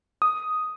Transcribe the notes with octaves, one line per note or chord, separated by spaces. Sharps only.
D#6